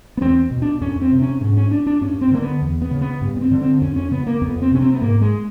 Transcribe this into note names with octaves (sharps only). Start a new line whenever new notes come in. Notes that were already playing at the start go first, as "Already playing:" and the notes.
B3
E2 C4
B2
D4
F2 C#4
C4
C3
C#4
G#2 C#4
C#4
D4
D4
G2 C#4
C4
D3 A#3
B3
E2
B3
C#3
B3
G2
B3
C4
D3
C4
F2 C#4
C#4
C#3 B3
A#3
F2 B3
C4
C3 C#4
C4
B3
G#2 A#3
G#3